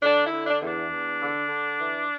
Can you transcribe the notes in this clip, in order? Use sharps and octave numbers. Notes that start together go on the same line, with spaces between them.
D3 D4
E4
D3
D4
E2
D4
E2
D3
D3
E3